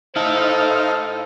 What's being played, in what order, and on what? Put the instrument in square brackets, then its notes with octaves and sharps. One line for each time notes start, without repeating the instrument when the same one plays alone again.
[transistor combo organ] D#4 F5 [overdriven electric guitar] E4 A4 [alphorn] C5